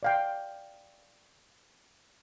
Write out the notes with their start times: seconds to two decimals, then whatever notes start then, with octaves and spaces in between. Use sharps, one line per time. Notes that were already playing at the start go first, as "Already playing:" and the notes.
0.03 D5 F5 G5